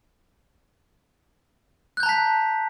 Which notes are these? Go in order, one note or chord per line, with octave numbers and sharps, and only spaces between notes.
A5 A#5 F#6 G6 B6